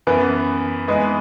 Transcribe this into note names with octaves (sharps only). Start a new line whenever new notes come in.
F#2 E3 B3
E3 G#3 B3 D#4